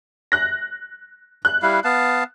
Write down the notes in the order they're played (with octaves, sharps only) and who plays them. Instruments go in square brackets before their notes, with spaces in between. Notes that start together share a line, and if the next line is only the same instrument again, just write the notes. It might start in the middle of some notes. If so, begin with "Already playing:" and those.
[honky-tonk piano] F#6 A#6
F#6
[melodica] G3 E4 F5
B3 F5 A5